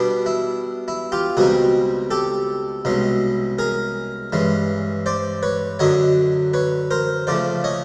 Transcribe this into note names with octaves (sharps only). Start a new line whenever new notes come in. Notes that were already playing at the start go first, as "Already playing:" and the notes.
Already playing: B2 G3 B3 D4
E4
E4
F4 G4
C#2 B2 G3 C4 D#4 F#4 G#4
G4 A4
C2 B2 G#3 C#4
G#4 A#4
G2 E3 G#3 C#4
C5 D5
B4 C#5
F#2 D3 F#3 C#5 D#5
B4 C#5
A#4 C5
C#3 F3 A3 C5 D5
C#5 D#5